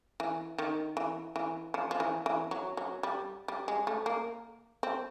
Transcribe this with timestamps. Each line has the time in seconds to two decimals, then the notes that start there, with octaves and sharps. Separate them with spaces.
0.20 E3
0.58 D#3
0.97 E3
1.36 E3
1.74 F3
1.91 F3
2.00 E3
2.26 E3
2.51 F#3
2.77 F#3
3.03 G3
3.48 G3
3.68 G#3
3.87 A3
4.06 A#3
4.83 C4